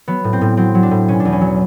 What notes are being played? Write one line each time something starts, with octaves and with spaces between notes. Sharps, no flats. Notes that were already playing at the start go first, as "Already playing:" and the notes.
F#3 B3
A2
C4
A2
F#3 C4
F#3
D4
A2
B2 C#4
D4
E2
C#4
F#3